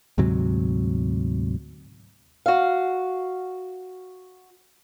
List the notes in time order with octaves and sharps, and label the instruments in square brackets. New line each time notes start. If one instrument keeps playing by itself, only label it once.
[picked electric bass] D2 G#2 C3 F#3
[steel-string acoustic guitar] F#4 F5